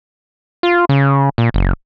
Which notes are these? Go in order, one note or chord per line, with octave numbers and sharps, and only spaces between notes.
F4
C#3
A#2
F#1